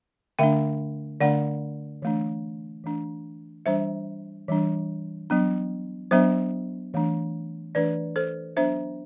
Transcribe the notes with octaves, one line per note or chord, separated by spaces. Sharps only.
D3 A3 D4 E5 G5
D3 A3 D4 D5 F#5
E3 A3 D4
E3 A3 D4
E3 G3 D4 C5 E5
E3 G3 D4
F#3 B3 D4
F#3 B3 D4 C5 E5
E3 A3 D4
E3 A3 D4 B4 D5
A4 C5
F#3 B3 D4 C5 E5